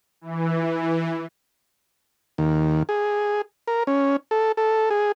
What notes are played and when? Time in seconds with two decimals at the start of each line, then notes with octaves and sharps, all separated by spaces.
0.21 E3
2.38 D#2
2.89 G#4
3.67 A#4
3.87 C#4
4.31 A4
4.57 A4
4.90 G#4